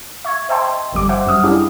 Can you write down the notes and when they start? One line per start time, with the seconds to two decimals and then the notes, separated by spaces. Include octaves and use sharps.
0.25 E5 C#6 G#6
0.49 C5 D#5 E5 G5 A5 C6
0.92 G1 F2 G3 D6
1.09 C5 E5 F#5
1.26 F#2 G3 D#6 F6
1.44 C#4 D4 E4 G4 G#4